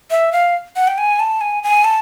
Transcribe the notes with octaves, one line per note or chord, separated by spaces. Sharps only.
E5
F5
F#5
G5
G#5
A5
G#5
G#5
A5